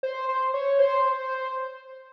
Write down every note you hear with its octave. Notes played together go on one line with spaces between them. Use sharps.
C5
C5
C#5
C5